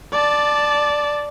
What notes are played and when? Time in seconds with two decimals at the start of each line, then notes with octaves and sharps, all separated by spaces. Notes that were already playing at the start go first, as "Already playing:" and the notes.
0.12 D5 A5